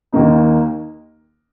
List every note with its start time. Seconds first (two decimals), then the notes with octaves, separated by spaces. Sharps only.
0.12 D#2 D#3 A#3 D#4